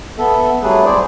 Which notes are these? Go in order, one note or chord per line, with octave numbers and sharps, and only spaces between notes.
B3 A4 E5
F#3 G3 A3 D4 G#4 B4
C4 E4 G#4 C5 D5